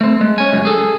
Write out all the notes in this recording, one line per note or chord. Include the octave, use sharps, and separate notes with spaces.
A3 C4
G#3
C#4 G#5
C#2 F#2
G#4 A4